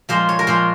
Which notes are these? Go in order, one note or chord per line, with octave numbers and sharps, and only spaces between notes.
A#2 F3 G#3 C5
C#5
A#4
A#2 F3 G#3 C5